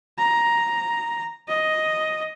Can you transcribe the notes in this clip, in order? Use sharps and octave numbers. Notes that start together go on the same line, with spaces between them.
A#5
D#5